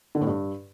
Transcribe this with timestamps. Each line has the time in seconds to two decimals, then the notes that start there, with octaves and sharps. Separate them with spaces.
0.15 D3
0.21 A2
0.27 G2